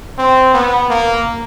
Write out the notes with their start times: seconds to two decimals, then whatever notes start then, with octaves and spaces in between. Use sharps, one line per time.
0.18 C4
0.54 B3
0.90 A#3